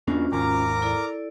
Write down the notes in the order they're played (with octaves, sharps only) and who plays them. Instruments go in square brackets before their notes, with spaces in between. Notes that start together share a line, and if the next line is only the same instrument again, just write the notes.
[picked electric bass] E2 A#3 D4 [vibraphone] C#4 F4 F#4
[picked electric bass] G#1 D#2 [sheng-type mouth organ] A#4 A#5 D6
[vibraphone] E4 A4 D5